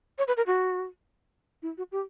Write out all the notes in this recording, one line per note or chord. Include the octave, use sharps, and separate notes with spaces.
C#5
B4
A#4
F#4
E4
F#4
G4